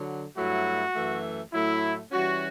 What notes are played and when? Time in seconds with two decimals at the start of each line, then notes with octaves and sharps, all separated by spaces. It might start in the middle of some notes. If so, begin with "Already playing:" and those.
Already playing: D3 F#3
0.37 G2 F#3 A3 E4 F#4
0.95 F#2 E3 A3
1.53 A2 F#3 A3 E4
2.12 E3 G3 C#4 F#4